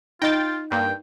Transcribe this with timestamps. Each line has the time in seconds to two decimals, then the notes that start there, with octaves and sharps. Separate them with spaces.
0.22 D#4 F4 D#5 G5 A6
0.71 G2 A#3 G5